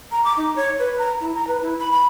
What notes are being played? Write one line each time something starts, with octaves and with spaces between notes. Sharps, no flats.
A#5
D6
D#4
C#5
B4
A#5
E4
A#5
B4
E4
B5
B5